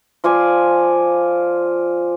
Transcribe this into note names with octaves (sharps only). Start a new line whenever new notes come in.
F3 F4 D5 G#5